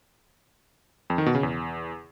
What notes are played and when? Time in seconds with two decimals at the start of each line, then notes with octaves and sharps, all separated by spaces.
1.10 F2
1.18 D#3
1.26 B2
1.35 C#3
1.43 E2